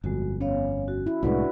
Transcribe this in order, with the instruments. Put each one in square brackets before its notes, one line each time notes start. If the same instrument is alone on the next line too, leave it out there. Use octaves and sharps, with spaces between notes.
[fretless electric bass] G1 F2 [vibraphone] G#3 F#4
[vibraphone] B3 C#5 F5 [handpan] C#4
[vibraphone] F#4
[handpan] E4
[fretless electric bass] C2 A2 G#3 [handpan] D4 E4 F#4 [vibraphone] B4 D5